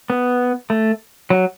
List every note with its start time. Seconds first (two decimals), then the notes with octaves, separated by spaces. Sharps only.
0.10 B3
0.70 A3
1.30 F#3